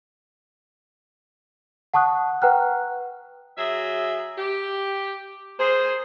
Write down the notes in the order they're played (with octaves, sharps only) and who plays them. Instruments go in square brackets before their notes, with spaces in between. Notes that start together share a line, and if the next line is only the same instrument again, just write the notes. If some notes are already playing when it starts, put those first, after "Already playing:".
[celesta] F#5 A5 C#6 D#6 F#6
B4 F#5 G5 A#5 F6 F#6
[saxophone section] F#3 G#4 E5
G4
A#3 G#4 C5